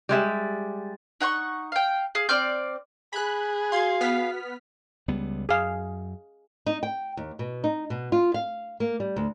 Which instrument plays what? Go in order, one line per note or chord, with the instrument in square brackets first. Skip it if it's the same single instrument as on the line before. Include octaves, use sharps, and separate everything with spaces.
[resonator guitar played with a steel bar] G3 G#3 E5
[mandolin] D#4 F#5 G5 C#6
F5 G5
G#4 F5
C4 D5 F6 G6
[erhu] G#4 [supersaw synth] B5 F#6
[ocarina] F#4 [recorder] F5 [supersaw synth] C6 G#6
[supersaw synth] B3 F6 B6
[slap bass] C#2 G3 B3
[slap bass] F#2 [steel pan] G#4 F5
[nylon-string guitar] D#4
G5
D#2
B2
D#4
B2
F4
F5
A#3
G3
D2